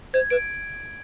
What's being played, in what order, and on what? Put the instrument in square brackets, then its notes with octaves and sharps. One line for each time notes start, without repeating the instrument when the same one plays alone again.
[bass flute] C5 [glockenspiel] G#6
[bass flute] B4 [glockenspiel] D7